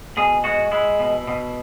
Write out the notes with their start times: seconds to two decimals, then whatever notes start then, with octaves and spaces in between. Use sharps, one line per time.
0.17 B2 G#4
0.44 G#3 F#4
0.71 G#3 E4
0.99 B2
1.27 B2